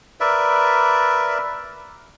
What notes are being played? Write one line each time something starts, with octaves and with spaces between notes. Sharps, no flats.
A#4 B4 D5 E5